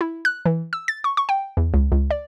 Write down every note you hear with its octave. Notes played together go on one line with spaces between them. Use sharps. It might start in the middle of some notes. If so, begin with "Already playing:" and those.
E4
F#6
E3
E6
A6
C#6
C#6
G5
E2
C#2
C#2
D5